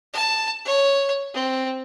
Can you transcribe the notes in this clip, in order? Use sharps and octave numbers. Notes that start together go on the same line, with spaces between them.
A5
C#5
C4